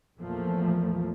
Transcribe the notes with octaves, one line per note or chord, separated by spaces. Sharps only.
A#1 E2 A#2 F3 A3 A#3